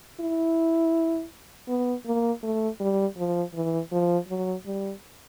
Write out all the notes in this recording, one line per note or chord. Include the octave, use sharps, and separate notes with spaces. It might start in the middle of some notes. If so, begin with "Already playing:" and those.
E4
B3
A#3
A3
G3
F3
E3
F3
F#3
G3